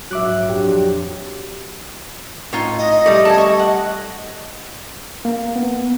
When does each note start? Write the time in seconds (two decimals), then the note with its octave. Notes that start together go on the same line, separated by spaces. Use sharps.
0.11 A#1 G#2 F#3 E5 D6 F#6
0.49 F2 D4 G4
2.53 A2 D#4 F4 C#5
2.77 D#5
3.06 G3 A3 D5
3.25 A4 D5 G#5
3.38 C#6
3.59 F#5
5.25 A#3
5.56 B3